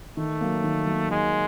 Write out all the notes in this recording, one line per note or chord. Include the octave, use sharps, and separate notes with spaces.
D#3 A3
F#3 A#3
D#3
F#3 A#3
D#3 G#3